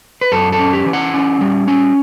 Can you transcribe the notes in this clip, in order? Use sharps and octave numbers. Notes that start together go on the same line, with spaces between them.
B4
F#2 A4
A4
C#4
G4
E3
F#5
C#4
G3
C#4